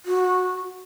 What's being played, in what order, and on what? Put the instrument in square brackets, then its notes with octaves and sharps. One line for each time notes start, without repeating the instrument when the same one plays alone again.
[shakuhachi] F#4